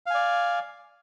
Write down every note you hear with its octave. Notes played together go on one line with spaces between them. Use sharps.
D5 F5 G#5